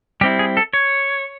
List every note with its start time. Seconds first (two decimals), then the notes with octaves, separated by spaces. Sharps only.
0.21 G3 C4 E4 G4
0.39 G#4
0.57 A4
0.73 C#5